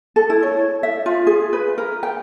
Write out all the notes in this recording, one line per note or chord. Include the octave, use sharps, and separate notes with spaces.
A4
E4
C#5
E5
F4
G#4
B4
A#4
G5